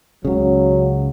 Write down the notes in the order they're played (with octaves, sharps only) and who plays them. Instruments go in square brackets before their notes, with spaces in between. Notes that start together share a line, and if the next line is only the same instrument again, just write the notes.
[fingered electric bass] C#2 C#3 [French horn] F#3